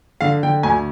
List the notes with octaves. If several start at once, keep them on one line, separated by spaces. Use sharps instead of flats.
D3 F5
D3 G5
D2 G#5